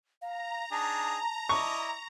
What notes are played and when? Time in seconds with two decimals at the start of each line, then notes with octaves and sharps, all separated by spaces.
0.22 F5 A#5
0.71 D4 D#4 G#4 A5
1.49 E4 D5 D#5 C#6